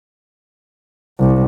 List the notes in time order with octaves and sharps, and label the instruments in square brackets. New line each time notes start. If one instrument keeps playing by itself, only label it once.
[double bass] C2